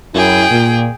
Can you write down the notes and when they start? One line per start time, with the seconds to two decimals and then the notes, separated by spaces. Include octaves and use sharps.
0.15 F#2 E4 G#4 G5
0.51 A#2